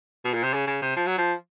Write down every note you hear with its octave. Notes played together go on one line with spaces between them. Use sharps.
B2
A#2
C3
C#3
C#3
C3
F3
F#3
F3